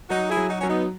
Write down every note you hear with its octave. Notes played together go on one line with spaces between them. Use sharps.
F#3 D#4 F#4
E4 G#4
F#3
D#4 F#4
F#3 C#4
B3 D#4